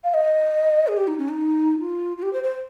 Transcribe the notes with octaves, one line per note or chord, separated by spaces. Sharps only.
F5
D#5
G#4
G4
D#4
C#4
D#4
F4
F4
G4
C5
C5